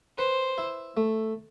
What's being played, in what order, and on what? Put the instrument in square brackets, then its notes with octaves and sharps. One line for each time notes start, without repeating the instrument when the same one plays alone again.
[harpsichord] B4 [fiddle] C5
[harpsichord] E4
A3